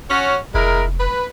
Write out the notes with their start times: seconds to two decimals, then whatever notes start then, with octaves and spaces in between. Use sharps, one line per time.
0.10 C#4 F#4
0.55 F1 G#3 E4 A#4
1.00 B4